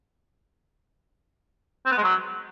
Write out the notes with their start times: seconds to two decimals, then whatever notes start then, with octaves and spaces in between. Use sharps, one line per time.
1.85 C4
1.91 B3
1.97 G#3
2.03 F#3